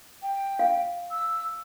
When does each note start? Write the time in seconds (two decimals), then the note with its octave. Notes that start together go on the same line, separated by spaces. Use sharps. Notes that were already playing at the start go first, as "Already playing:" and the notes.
0.22 G5
0.59 F5
1.11 E6